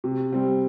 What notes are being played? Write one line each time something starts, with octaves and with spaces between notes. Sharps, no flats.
C3
G3 C4